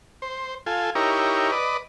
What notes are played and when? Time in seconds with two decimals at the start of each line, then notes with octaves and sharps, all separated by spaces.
0.22 C5
0.66 F4 A4 G#5
0.95 D#4 E4 G4 A#4 C#5
1.52 B4 D5 D#5